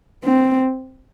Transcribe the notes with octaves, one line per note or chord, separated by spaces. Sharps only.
C4